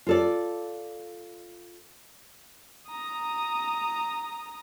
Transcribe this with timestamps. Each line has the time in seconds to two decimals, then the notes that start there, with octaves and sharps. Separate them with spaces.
0.07 F4 A4 D5
2.89 A#5 D#6